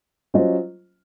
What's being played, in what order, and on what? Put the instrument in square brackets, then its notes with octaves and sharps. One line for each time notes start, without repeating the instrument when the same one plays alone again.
[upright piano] F#3 C#4 F4 C5 D#5